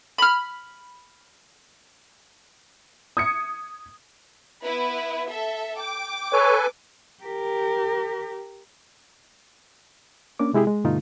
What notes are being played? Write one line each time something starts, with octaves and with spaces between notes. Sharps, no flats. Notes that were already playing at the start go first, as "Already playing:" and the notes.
B5 F6
D#6 G#6 C#7
B3 E4 B4
A4 E5
G5 D6
A4 B4 C#5 G#5
G4 A#4
A#3 C#4 D4 D6
C3 G#3 E4 G4 G#4
G#3
G2 B2 D3 A3 D#4 F4